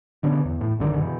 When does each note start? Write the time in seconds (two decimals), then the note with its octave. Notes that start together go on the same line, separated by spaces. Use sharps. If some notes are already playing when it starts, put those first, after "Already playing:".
0.23 B2 D3 B3 C#4
0.45 E2
0.61 A2
0.79 A#1 F#2 D3 D#3
0.98 B2 E3